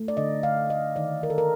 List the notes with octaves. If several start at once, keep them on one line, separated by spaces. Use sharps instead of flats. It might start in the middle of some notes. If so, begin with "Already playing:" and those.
Already playing: A3
D5
D3 D#5
D3 F5
A3 D#5
D#3 D5
D#3 A#4
A4
A#4